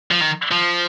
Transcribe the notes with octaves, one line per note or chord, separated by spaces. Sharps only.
F3
D#3
F3